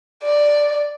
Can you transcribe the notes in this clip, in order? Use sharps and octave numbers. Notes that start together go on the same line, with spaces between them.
D5